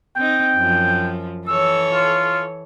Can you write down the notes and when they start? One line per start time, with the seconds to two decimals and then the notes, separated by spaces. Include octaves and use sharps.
0.16 C4 D#4 G5
0.57 F#2 F3
1.47 E3 A4 C#5 E6
1.94 F4